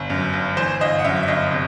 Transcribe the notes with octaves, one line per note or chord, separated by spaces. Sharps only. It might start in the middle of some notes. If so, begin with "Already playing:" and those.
Already playing: G1
F#2
G1
E3 C5
G1 D#5
F#5
F#2 E5
E5
G1 D#5
C3